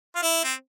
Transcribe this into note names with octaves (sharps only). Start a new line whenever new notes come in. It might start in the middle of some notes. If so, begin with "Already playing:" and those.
F4
E4
C4